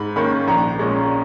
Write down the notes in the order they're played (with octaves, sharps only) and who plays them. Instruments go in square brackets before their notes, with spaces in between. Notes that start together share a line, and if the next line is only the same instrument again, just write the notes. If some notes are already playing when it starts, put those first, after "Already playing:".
Already playing: [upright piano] G#2 B5
D#3 A#3 C#4 B5
A#1 A#5
A#2 G#3 C#4